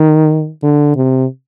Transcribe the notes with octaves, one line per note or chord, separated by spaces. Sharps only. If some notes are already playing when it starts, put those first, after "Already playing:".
Already playing: D#3
D3
C3